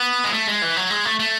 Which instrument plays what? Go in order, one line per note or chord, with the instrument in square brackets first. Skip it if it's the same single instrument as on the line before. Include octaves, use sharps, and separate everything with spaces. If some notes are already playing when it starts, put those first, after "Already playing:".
Already playing: [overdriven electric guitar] B3
G#3
A3
G#3
E3
F#3
G#3
A3
A3